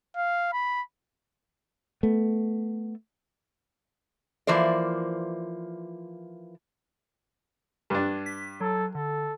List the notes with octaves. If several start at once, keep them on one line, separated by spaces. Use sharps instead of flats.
F5
B5
A3 B3
E3 F3 A#3 C5 D5
G2 D4
B6
F#3 A4
D3 A4